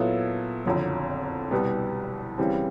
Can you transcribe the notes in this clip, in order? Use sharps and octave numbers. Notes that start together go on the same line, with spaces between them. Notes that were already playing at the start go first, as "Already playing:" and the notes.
Already playing: A#2 F#3 B3 E4 A4
F#1 F2 D3 F#3
C2 B2 G3 B3
C#3 E3 G3 C4